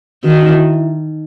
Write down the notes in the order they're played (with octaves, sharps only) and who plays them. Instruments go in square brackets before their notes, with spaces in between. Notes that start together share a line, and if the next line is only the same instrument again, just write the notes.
[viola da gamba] D#3 [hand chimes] F#4
[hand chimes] D#4
E4
D#4